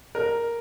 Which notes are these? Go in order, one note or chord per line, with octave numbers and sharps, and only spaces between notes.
A#4